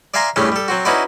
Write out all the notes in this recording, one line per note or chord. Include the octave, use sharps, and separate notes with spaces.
D5 E5 F5 G#5 A#5 C6
E2 A2 G3 A3 C#4 D4
G3 A4
F#3 C4 F#4
C#4 D#4 E4 F#4 B4 D5